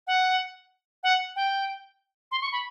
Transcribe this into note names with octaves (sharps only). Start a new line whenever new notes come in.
F#5
F#5
G5
C6
C#6
B5